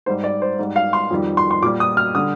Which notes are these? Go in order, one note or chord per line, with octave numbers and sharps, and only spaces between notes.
G#2 G3 C5
D5
C5
G#2 G3
F5
C6
F2 D#3 G3
C6
C6
A#2 G3 D6
D#6
F6
D3 G3 D#6